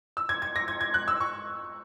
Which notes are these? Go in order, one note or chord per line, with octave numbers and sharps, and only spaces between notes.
E6
G#6
G#6
A#6
G#6
G#6
F#6
E6
C#6